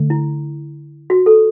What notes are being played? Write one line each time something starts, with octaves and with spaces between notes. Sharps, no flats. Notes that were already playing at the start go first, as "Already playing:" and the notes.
Already playing: D3 A3
E4
F#4
A4